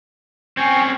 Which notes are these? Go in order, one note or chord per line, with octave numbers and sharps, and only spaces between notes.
C4 C#4 G5 G#5 C#6